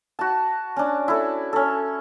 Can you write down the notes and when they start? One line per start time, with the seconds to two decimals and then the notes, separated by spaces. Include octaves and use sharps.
0.19 F#4 A5
0.76 C#4 D4
1.08 E4 A4
1.53 C#4 A4